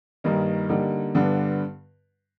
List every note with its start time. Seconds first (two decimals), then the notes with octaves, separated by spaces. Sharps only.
0.24 G2 D#3 G3 A#3 D#4
0.69 D3 G3 A#3 D#4
1.14 G2 D3 G3 B3 D4